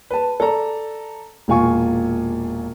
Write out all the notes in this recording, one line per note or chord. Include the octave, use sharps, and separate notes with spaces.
B4 A5
A4 D5 A#5
E1 A#2 F4 G#5 C#6